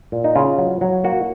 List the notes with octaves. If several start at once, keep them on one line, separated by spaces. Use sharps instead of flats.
A#2
D#4
C#3 F4
F#3
F#3
A#3 F#4